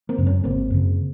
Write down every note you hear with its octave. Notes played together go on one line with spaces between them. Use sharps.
A#3 C4
F#2 C#3
B3 C#4
G#1 A#3 C4
F#2 C#3